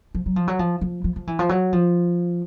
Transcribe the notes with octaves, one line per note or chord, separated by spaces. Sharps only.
F3
F#3
F3
F#3
F3
F3
F3
F3
E3
F3
F#3
F3